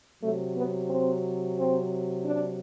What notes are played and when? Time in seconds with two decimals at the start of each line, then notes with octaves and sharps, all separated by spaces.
0.20 C3 F#3 A3
0.54 B3
0.88 C4
1.56 C4
2.23 D4